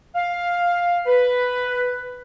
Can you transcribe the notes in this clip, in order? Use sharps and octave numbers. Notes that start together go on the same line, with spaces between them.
F5
B4